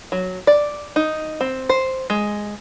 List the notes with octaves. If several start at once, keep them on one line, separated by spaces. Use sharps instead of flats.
F#3
D5
D#4
C4
C5
G#3